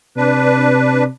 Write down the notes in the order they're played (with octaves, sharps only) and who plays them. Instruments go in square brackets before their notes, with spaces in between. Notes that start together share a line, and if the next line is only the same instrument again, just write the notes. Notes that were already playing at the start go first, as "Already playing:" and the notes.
[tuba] C3 [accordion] D4 B4